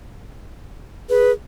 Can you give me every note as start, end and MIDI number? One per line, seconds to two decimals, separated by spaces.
1.10 1.32 68
1.10 1.31 71